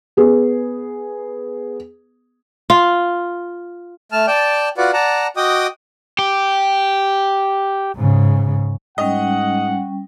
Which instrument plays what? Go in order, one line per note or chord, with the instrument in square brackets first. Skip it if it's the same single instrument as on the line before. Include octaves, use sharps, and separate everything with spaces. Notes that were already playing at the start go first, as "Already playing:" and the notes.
[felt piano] B3 G#4
[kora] F4
[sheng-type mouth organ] A3 A5 F6
D5 G5 A5
F4 F#4 B4 D5 F#5
D5 F#5 A5 A#5
F#4 D#5 G5 D6 D#6
[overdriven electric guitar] G4
[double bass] G#2 C#3
[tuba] G#2 [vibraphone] G3 C#4 G5 [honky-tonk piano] D#5 [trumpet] F#5